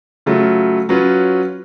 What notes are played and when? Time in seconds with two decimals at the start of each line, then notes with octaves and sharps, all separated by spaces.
0.26 C#3 F#3 A3 F4
0.89 F#3 C#4 F4 B4